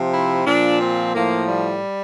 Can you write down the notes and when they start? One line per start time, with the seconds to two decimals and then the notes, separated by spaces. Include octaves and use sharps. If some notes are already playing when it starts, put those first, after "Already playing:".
Already playing: C3 F3
0.13 E4
0.46 A#2 F3 D4
0.80 C4
1.14 A2 F3 A#3
1.48 G3